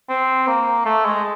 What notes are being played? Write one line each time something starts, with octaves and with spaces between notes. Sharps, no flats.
C4
A#3
A3
G#3